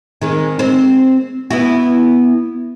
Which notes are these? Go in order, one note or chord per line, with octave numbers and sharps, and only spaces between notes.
D#3 G#3 C4
C4 C5
B3 E4 F#4